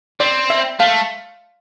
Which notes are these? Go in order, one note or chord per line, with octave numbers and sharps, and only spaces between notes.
C4 D5
E5
A3 F5